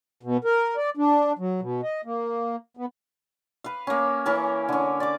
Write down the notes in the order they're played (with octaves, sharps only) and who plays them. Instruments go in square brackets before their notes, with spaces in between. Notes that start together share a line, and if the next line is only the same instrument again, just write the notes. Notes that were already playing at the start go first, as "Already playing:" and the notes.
[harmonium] B2
A#4
D5
D4
F#3
B2
D#5
A#3
B3
[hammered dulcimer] B4 F5
A#3 C#4
E3 C#4 A#4
D3 C#4
D5 D6